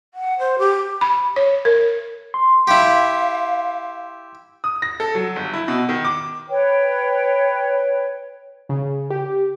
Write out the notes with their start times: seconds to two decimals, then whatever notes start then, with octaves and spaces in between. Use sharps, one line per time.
0.14 F#5
0.39 C5
0.59 G4
1.01 B5
1.36 C#5
1.65 A#4
2.34 C6
2.67 E4 G4 F5
4.64 D#6
4.82 A#6
5.00 A4
5.15 F#3
5.36 G1
5.53 E4
5.68 B2
5.89 D#3
6.05 D6
6.49 B4 C#5 G5
8.69 C#3
9.10 G4